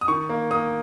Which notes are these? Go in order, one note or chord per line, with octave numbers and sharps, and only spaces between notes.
D#6
D#3 C#6
A#3
A#3 D#6